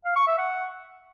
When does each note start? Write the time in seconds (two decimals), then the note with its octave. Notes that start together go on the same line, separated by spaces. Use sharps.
0.05 F5
0.16 C#6
0.27 E5
0.38 F#5